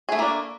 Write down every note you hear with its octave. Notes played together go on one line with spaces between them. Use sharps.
A3 A#3 D4 E4 G#4